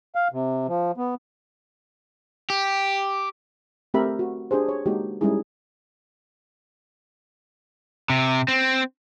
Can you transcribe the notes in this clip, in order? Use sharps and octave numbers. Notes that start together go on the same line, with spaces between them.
F5
C3
F3
B3
G4
A3 C4 G4 A#4 E5 B5
F#4
D4 G4 G#4 C5
C#5
G#3 A#3 D#4 F#4 G4
G3 G#3 C#4 D#4 E4 G#4
C3
C4